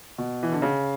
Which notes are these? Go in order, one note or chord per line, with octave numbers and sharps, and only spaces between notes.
B2
E3
D3
C#3